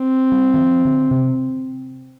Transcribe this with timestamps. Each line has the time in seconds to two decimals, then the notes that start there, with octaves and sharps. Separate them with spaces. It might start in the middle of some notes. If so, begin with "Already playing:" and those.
Already playing: C4
0.32 G3
0.54 D#3
0.58 F3
0.85 D3
1.11 C3